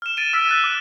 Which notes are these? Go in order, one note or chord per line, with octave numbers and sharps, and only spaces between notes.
F6 E7
A6 D7 D#7
E6 F6 B6
F#6 A6
D6